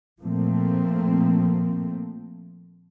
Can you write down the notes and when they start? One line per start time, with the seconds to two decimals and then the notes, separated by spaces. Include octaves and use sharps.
0.21 A#2 F3 A3 A#3 C4